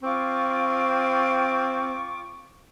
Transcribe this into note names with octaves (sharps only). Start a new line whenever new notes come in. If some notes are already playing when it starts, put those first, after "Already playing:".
C4 F4 C#6 D6